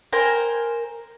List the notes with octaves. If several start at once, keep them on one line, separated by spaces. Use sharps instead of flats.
A#4 C5 G5 G#5